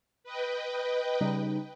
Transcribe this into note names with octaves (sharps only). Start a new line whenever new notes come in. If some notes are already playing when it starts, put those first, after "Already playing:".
B4 D#5 G5
C#3 G3 D#4